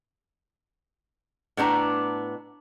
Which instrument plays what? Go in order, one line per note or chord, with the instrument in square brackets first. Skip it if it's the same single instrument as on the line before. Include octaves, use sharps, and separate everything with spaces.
[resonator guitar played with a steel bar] A2 B3 D4 A#5